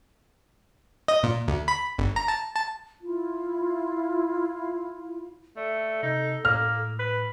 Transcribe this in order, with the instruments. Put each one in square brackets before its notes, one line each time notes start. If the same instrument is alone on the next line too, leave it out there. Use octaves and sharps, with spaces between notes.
[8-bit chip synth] D#5
A#2
D2
B5
G1
A#5
A5
A5
[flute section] E4 F4
[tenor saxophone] A3 [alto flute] A4 [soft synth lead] D5
[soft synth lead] C3 [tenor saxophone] D#4
[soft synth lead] A2 [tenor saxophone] A#3 [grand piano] F6
[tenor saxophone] B4 [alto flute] B5